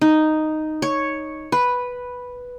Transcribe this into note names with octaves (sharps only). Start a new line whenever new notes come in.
D#4
C#5
B4